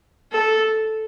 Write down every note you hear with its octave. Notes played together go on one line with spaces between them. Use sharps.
A4